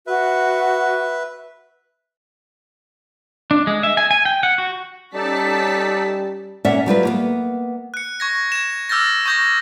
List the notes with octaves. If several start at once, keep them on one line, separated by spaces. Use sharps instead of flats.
F#4 B4 E5
D4
G#3
E5
G#5
G#5
G5
F#5
F#4
G3 C#4 D#4 A4 D5 A5 B6
A#2 C#4 D5 E5 F#5
F#3 G3 F4 B4
A#3 B3
F#6 C#7
C#6 G#6 A#6
G#6 E7
D6 E6 F6 G6 A6 A#6
C#6 D#6 G6 G#6 A#6